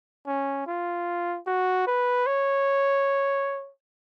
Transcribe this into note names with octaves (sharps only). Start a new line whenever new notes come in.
C#4
F4
F#4
B4
C#5